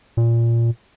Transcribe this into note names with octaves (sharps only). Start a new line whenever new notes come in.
A#2